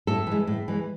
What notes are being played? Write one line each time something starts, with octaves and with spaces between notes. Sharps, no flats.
A2 A4
E3 G#3
A2
E3 G#3